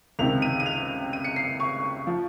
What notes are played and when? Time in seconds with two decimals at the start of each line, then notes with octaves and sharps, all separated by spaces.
0.19 C#2 C3 D#3 F7
0.42 D#7
0.60 D#7
0.66 F7
1.13 D#7
1.24 C#7
1.36 C7
1.60 C#6
2.07 F3